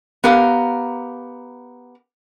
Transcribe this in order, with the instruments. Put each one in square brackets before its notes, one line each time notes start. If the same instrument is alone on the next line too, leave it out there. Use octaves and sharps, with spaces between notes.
[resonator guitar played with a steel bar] B3 G4 A#4 F5